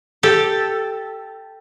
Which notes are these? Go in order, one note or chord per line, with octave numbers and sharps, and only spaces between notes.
G4 A4